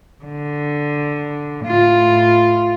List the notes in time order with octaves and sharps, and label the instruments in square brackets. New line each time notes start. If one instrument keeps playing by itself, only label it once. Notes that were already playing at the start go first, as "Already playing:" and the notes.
[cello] D3
A2 F4